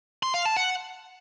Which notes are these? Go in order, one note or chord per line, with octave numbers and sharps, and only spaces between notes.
C6
F5
A5
F#5